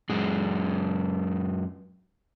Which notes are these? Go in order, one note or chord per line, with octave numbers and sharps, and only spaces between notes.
F#2 G#3